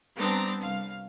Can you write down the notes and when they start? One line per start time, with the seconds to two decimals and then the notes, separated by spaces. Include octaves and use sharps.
0.17 G3 B3 C4 D4 A#5 D6
0.61 C2 F5